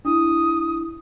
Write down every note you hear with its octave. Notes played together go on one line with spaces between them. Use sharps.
D4 E4 D#6